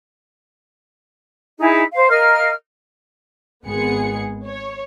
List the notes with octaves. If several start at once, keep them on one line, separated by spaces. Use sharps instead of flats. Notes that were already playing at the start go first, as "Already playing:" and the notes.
D#4 E4 G#4
C5 F5
A#4 D#5 F5 F6
G#1 G#3 B3 G#4 C#7
C#5